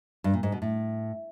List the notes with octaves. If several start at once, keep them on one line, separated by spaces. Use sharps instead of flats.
G2
A#2
G#2
B2
A2